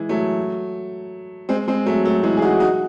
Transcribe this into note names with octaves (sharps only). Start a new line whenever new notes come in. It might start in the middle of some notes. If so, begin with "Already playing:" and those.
Already playing: E3 G#3
F#3 A3
G#3 C4
G#3 C4
F#3 A3
F#3 A3
E3 G#3
G#4
D#4 F#4
D#4 F#4